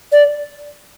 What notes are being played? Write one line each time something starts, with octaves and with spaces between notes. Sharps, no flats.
D5